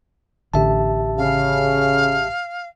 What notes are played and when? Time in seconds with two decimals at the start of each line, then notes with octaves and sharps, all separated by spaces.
0.54 A1 D3 G4 E5 A5
1.18 C#3 F5